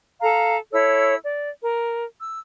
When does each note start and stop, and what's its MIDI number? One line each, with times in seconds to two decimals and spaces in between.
0.21 0.57 69
0.21 0.57 77
0.21 0.57 82
0.72 1.15 64
0.72 1.15 69
0.72 1.15 73
0.72 1.15 88
1.24 1.48 74
1.62 2.03 70
2.18 2.37 88